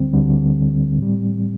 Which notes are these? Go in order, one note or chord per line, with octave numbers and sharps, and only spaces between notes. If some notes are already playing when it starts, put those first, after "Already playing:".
Already playing: D2 D3 G3 C4
D2 D3 G3
A2 G3